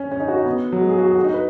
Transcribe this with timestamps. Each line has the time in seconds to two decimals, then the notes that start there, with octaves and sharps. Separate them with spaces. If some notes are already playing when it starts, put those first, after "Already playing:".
Already playing: C#4
0.12 C#4
0.20 D#4
0.28 F#4
0.38 D#4
0.46 B3
0.72 F#3
0.81 G#3
0.89 G#4
0.98 F#4
1.07 G#4
1.16 F#4
1.24 D#4
1.34 B4